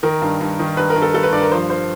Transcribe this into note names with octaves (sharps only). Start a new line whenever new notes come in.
D#3 A#4
G2
G2
D#3
G2 B4
A#4
G2
A4
G2 A4
B4
G2 D5
A#4
F3 C5
C5